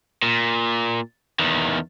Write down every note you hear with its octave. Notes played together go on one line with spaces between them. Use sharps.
A#2
E2 D#3